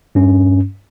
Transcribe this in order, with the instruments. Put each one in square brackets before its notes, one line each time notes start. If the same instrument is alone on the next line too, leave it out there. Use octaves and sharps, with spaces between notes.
[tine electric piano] G2 C#4